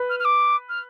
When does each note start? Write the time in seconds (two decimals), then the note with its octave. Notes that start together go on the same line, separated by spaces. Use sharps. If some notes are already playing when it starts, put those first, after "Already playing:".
Already playing: B4
0.09 F6
0.19 F6
0.24 D6
0.69 F6